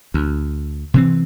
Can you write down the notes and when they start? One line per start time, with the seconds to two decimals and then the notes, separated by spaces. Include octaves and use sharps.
0.14 D2
0.94 C3 E3 C4